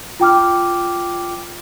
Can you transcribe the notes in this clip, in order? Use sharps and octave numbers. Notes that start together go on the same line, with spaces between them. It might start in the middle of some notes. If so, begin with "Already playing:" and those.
F4 G5 D6 F6